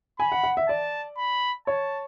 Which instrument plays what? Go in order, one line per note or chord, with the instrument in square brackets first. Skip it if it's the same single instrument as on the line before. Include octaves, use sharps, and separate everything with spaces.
[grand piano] G#5 [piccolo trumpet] B5
[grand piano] F#5
F#5
E5
[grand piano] D5 [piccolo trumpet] A5
[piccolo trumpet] B5
[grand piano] C#5 [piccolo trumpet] A5